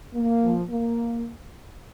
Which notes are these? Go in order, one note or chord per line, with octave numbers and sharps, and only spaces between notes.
A#3
A#2 F3
A#3